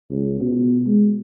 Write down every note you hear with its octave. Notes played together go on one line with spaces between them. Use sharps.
C#2
B2
G#3